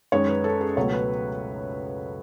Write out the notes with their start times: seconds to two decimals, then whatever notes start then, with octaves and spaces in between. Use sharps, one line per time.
0.12 F#2 D#3 G#3 C#5
0.28 B4
0.44 A4
0.61 G#4
0.77 C#2 B2 F#3 A3 C#5
0.93 B4